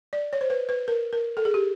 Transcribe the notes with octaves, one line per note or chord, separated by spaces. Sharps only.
D5
C#5
C5
B4
B4
A#4
A#4
A4
G#4
G4